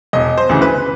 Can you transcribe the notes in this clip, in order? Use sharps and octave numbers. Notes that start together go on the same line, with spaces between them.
E1 D#5
C5
D2 C#3 E3
B4